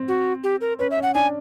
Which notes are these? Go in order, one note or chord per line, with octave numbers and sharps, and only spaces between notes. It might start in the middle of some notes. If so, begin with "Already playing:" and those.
Already playing: C4
F#4
G4
A#4
C#4 B4
E5
C#4
F#5
D4 G#5